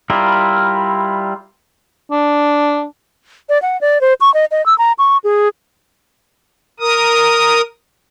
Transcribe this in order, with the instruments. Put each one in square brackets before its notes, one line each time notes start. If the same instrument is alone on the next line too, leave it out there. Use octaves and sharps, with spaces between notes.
[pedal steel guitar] G3 E4 F4 A#4
[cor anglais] D4
[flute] D5
F#5
D5
C5
C#6
D#5
D#5
E6
A#5
C#6
G#4
[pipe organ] A#4 D#6